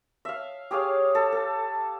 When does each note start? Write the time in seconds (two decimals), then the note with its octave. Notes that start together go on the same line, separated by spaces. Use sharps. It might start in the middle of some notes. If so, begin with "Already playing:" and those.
0.25 E5 F5
0.71 G4 G#4 C#5 F5
1.15 A4
1.32 A4